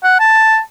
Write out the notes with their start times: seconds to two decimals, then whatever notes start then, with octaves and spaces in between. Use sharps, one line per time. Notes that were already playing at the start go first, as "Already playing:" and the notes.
0.04 F#5
0.19 A5